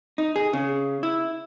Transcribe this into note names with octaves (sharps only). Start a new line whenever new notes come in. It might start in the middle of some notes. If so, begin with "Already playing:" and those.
D#4
G#4
C#3
E4